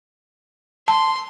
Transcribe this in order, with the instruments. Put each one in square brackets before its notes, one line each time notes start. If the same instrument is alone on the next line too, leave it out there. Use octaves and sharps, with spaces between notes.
[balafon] A5 [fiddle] C6